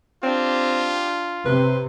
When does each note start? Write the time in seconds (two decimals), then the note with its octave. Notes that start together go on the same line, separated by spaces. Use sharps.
0.23 C4 D4 F4 G4
1.46 C3 B4 C6